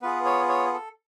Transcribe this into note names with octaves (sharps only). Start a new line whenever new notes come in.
B3 F4 G#4 B4
C#5
C#5
A4